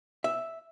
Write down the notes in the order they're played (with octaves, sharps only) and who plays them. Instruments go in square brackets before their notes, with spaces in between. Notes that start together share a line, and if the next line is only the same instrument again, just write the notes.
[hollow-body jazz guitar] E5